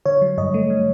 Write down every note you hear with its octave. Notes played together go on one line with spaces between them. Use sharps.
D3 C#5
F#3
G2 D#5
A3
D3